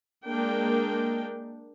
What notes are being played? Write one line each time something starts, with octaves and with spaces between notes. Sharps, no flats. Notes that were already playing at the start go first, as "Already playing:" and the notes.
G#3 A#3 D4 A#4 G5